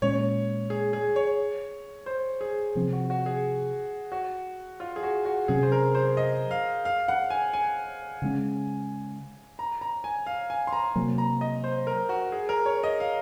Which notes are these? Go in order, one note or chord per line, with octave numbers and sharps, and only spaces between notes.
A#2 G#3 C#4 C#5
G#4
G#4
C#5
C5
G#4
C3 F3 C4
F#4
F#4
G#4
F#4
F4
G#4
F#4
F#4
C3 F#3 C#4 G#4
C5
A#4
C5
D#5
F5
F5
F#5
G#5
G#5
C#3 G#3 C#4
A#5
A#5
G#5
F5
G#5
C6
A#5
C3 F#3 A#3
A#5
D#5
C5
A#4
F#4
G#4
A#4
C#5
D#5
F5